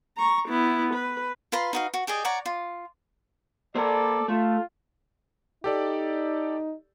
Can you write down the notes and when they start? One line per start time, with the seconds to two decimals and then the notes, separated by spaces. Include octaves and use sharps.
0.18 A#5 C#6
0.49 B3 E4
0.94 B4
1.52 F4 B4 A#5 C6
1.73 D#4 F#4 F5
1.94 F#4
2.07 G4 G#4 D5 D#5
2.25 C#5 D5 F#5 A#5
2.46 F4
3.75 A#3 A4 C5 D5
4.28 A3 F4
5.64 D#4 G4 A4 D5